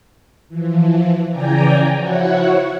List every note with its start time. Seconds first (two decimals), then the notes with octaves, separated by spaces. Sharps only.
0.49 E3 F3
1.30 C#3 E3 D5 G5 G#5 A#5
1.94 F3 E4 F#4 C#5 F#5